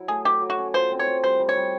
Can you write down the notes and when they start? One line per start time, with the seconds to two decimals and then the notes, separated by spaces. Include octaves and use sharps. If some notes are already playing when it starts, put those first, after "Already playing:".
Already playing: F#3 E4
0.08 A3 G#4
0.25 F#3 G4
0.41 F#3
0.50 F#4
0.58 C#4
0.74 F4 C5
0.91 C4
0.99 C#5
1.07 F4
1.24 G3 C5
1.40 G3
1.49 C#5
1.57 G3